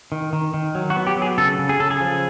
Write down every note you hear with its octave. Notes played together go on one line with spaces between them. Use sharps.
D#3
D#3
D#3
F#3
F#4
B3
G4
F#3
G#4
C#3 A4
C#3
G#4
C#3 A4
G#4
F3